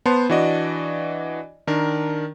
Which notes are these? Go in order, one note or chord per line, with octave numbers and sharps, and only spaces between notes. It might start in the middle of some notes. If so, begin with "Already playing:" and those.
B3 B4 C5 A5 C6
E3 D4 F#4 D5 D#5
D#3 D4 A#4